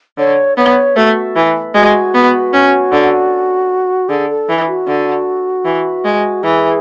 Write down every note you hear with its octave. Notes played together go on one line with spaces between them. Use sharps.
D3 C#5
B3 C#5
A3 F#4
E3
G#3 F#4
B3
C#4
D3
D3 G#4
A4
E3
F#4
D3
E3
G#3
E3 G#4